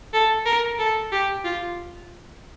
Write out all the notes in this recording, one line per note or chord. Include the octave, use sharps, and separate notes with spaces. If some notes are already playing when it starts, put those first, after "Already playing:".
A4
A#4
A4
G4
F4